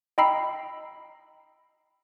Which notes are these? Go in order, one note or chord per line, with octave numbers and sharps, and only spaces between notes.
D#5 G5 A#5 B5 E6 C7